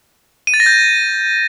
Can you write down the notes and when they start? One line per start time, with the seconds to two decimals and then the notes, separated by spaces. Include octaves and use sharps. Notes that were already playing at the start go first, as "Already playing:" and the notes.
0.47 D#7
0.54 A6
0.60 A#6
0.66 G6